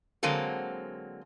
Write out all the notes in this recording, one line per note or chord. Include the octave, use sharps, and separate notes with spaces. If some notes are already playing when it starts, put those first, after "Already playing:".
D3 F#3 G#3 A#3 C4 A4